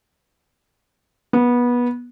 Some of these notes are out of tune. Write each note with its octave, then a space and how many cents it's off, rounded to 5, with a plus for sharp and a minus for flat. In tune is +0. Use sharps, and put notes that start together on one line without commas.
B3 -20